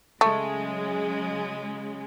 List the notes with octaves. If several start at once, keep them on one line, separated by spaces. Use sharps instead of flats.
C#3 F#3 G#3 A3